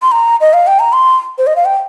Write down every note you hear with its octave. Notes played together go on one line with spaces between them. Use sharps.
C6
A#5
D#5
F5
G5
A#5
C6
C5
D#5
F5
G5